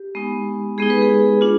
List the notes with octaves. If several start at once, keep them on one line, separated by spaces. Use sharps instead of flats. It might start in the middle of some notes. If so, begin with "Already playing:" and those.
Already playing: G4
G#3 B3 D#4
G#3 B3 D#4 G#4
B4
G#4
D4 F4